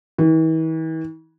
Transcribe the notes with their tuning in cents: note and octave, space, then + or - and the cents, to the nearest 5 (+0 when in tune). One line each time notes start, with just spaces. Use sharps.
E3 -45